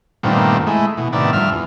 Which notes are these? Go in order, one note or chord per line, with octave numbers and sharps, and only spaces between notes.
G2 A#2 D#3 A3 B3 C4
G#3 A3 E4
B2 E3
A2 C3 D#3 B3 D5 E5
G2 F3 E5 F6
E2